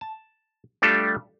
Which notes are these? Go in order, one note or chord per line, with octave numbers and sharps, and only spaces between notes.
A5
G3 A3 D4 F4 G4 A4